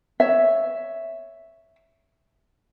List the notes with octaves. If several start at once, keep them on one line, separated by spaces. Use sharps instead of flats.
C#5 E5